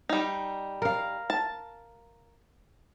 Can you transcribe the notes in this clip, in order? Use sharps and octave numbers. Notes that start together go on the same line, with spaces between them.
G3 D#4
A#4 F5
A5